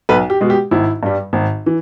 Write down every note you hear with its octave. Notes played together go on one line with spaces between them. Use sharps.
B1 B4
G4
B2 G#3
G4
G#1 E4
G2 G3
G#1
E3